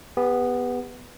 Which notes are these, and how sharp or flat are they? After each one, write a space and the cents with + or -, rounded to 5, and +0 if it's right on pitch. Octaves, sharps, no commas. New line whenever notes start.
B3 +0 G4 +45